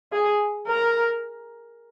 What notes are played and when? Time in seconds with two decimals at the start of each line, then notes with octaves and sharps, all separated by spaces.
0.12 G#4
0.67 A#4